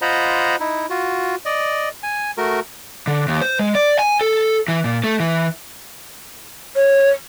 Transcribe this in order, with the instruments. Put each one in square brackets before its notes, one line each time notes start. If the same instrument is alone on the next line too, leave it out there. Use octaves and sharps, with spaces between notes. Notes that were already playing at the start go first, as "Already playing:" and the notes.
[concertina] F4 C5 D#5 F#5 A#5 B5
D#4 E4
F4 F#4
D5 D#5
G#5
A3 F#4 A#4
[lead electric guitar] D3
D#2
C5
G#3
D5
G#5
A4
E3
A#2
A3
E3
[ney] C#5